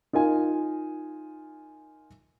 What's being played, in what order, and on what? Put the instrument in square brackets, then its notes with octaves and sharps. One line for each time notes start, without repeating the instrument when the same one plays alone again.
[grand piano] D#4 F4 A#4 G#5